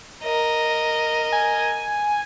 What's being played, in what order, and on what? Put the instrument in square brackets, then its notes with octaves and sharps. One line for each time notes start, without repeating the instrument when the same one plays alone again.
[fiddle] A#4 D#5
[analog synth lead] G#5